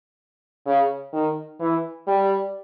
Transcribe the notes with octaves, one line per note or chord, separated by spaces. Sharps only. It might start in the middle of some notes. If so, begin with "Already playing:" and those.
C#3
D#3
E3
G3